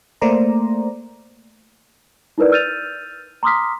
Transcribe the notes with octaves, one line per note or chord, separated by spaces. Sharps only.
A3 A#3 C5 D5 A#5
D#4 E4 A#4 B4 D5
E6 F6 G6 A6 D#7 F7
A#5 C6 D6 D#6 F6 B6